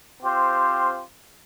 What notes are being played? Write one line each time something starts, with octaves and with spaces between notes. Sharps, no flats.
C4 F4 G4 C5